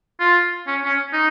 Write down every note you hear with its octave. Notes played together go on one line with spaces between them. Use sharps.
F4
C#4
C#4
D#4